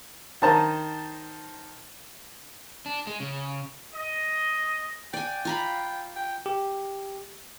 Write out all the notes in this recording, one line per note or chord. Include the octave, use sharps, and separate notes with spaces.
D#3 D#4 C5 A5 A#5
D4
G#3
C#3
D#5
D5 G5 G#5
F4 A#5 B5
G5
G4